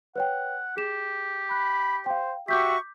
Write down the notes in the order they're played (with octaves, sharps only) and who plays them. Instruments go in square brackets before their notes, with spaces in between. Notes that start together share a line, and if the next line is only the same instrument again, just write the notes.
[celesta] B4 C#5 G5 [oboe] F#5
[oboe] G4 [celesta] G#4 E7
[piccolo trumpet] B5 [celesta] F#6
[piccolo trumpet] C5 [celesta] F5 G5
[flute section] F#4 E5 C#6 [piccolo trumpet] G4 [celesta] D6 G6 B6 [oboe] E6